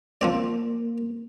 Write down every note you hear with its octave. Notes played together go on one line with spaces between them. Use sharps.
F3 A#3 C4 D5